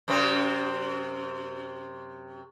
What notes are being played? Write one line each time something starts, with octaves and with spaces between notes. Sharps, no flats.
F#2 C3 C4